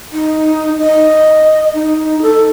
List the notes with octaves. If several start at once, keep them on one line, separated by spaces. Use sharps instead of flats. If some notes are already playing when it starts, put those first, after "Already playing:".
D#4
D#5
D#4
A4